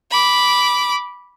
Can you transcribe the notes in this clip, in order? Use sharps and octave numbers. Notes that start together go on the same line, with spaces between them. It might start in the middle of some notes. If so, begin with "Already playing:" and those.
B5 D6